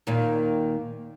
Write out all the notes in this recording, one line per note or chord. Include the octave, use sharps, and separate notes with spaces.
D#2 A#2 D#3